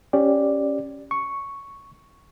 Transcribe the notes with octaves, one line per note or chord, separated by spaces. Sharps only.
C#4 G4 D5
C#6